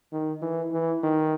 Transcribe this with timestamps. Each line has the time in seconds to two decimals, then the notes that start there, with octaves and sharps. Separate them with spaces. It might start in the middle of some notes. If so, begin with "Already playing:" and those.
0.12 D#3
0.42 E3
0.72 E3
1.03 D#3